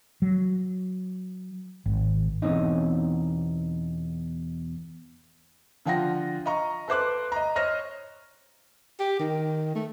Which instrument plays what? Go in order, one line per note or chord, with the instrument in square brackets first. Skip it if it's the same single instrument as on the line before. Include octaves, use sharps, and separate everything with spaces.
[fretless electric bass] F#3
G#1
[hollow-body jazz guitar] E2 B2 E3 C4 C#4 D#4
[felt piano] D3 F3 F4 F#5 G5 A#6
D#5 F5 A#5 C#6
A4 B4 C5 D6 F#6
D#5 A#5
C5 C#5 D#5 F6 A#6
[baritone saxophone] G4
D#3
A3